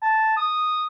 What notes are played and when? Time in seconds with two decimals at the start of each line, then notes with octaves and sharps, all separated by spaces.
0.02 A5
0.36 D#6